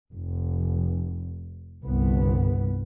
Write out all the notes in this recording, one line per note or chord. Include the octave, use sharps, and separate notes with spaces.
F1
G1 C2 B3